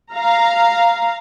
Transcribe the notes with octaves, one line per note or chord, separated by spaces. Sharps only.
F5 A#5